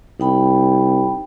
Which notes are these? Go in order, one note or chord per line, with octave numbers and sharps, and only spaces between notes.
C2 D#4 G5 B5